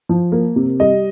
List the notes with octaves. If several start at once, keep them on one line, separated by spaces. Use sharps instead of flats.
F3
A#3
C3
G3 D#5